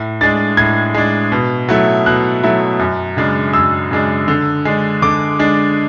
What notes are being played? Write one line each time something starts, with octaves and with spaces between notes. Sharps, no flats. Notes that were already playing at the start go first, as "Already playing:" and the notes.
Already playing: A2
G#3 D4 A6
A2 G#6
G#3 D4
B2
F#3 A3 E4
B2 F#6
F#3 A3 E4
F#2
C#3 G#3 D4
F#2 E6
C#3 G#3 D4
D3
G#3 D4
D3 D6
G#3 D4